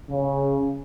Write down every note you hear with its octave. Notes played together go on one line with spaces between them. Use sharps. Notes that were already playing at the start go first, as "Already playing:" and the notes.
C#3